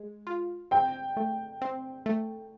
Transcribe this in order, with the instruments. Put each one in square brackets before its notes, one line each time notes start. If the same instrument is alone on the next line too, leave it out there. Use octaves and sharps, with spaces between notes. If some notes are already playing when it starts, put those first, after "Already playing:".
Already playing: [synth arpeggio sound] G#3
F4
[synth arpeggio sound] C4 [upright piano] G5
[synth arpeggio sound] A3
C4
A3